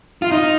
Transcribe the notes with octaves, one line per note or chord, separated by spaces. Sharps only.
F4
D#4